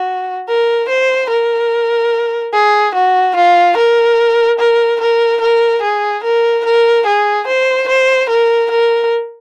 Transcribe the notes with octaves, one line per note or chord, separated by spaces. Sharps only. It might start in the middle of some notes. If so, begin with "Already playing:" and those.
Already playing: F#4
A#4
C5
A#4
G#4
F#4
F4
A#4
A#4
A#4
A#4
G#4
A#4
A#4
G#4
C5
C5
A#4
A#4